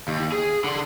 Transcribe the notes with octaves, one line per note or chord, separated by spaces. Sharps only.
D#2
G#4
D3 C6